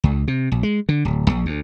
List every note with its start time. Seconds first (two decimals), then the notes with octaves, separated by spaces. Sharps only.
0.04 C#2
0.28 C3
0.52 A#1
0.63 G#3
0.89 D3
1.05 D1
1.30 A#1
1.46 D2